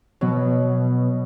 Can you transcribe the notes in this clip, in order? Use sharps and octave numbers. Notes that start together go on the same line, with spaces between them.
B2 F#3